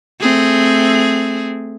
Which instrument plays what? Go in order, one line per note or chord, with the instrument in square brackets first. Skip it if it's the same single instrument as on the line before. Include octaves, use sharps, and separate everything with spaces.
[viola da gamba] A3 C4 G#4